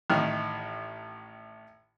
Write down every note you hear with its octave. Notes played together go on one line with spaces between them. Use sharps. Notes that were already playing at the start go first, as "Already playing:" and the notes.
A1 D#3 F6